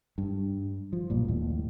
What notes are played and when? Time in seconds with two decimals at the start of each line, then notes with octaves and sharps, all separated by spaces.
0.18 G2
0.93 F3
1.10 B1 G2 A#2
1.28 D#2 A2